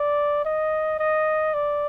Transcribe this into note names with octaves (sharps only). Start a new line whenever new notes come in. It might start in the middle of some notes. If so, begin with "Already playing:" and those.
Already playing: D5
D#5
D#5
D5